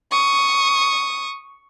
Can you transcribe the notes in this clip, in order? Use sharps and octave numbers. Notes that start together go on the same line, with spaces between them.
C#6 D#6